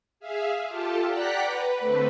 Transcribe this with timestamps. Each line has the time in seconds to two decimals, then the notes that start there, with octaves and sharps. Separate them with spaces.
0.20 G#4 E5 F5
0.66 F4 G4 A4 A5
1.08 D5 F#5 G5 A#5 F#6 B6
1.42 B4
1.78 D3 A3 C4 B4